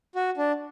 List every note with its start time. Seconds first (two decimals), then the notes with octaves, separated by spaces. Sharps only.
0.15 F#4
0.37 D4